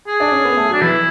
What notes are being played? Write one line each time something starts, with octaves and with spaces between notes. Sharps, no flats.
G#4
D4
C#4
B3
A3
F#3
D4
E3 E4